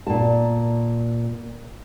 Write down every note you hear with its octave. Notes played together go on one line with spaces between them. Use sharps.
A#2 A5